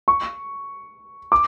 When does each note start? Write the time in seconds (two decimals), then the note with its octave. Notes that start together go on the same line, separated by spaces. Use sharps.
0.08 C#6
1.32 D6